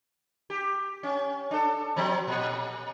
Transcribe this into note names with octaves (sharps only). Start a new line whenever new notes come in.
G4
C#4
D4 A4
F3 F#3 C4
A#2